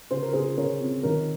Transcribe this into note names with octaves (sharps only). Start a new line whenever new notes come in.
C#3 C5
A#4
C#3 G#4 C5
C#3 A#4 C#5
C4
D#3 A#4 C#5